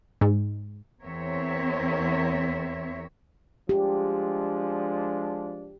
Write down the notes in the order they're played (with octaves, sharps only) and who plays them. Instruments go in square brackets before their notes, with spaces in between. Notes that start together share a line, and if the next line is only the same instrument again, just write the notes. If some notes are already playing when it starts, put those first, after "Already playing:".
[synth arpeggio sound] G#2
[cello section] E2 C4 A#4 C#5 E5
[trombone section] F3 G#3 D4 [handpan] G4